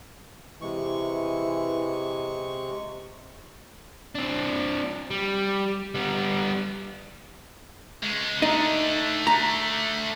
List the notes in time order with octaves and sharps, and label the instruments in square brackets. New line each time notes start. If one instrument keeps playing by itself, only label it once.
[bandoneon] C3 G#3 C#6 [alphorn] E3
[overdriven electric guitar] C4 D4
G3
G3 B3
[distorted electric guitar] C#2 G#3
[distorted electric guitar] A3 D4 [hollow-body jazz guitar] D#4
[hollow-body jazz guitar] A#5